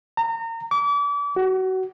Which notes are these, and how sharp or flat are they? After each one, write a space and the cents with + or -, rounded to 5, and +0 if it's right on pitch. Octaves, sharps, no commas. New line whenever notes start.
A#5 -30
D6 -35
F#4 +25